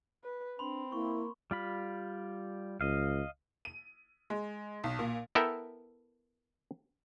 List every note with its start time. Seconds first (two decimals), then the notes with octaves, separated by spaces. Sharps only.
0.24 B4
0.59 C4 D4 B5 C6
0.92 A#3 E4 C#6
1.51 G3 F4 B5
2.81 C#2 D#5 F5
3.65 D#7
4.30 G#3
4.84 B1
4.99 A#2
5.35 B3 E4 A4 A#4 E5 G5